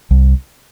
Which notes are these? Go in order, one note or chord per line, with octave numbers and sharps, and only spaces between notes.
C2